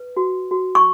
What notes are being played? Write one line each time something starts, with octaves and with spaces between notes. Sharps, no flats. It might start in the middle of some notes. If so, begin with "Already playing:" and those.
Already playing: B4
F#4
F#4
C#6